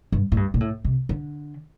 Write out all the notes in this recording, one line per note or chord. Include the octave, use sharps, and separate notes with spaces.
G2
A2
G2
A#2
A2
C3
D3